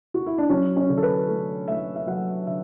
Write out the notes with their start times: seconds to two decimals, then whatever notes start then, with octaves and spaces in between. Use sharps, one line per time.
0.14 F#4
0.26 E4
0.38 D4
0.49 F#3 C#4
0.77 C#4
0.89 D3
0.97 A4
1.03 B4
1.28 A3
1.68 A3 E5
1.96 E5
2.07 F#3 F#5
2.46 D3 E5